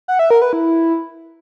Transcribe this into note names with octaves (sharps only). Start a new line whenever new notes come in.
F#5
E5
A#4
B4
E4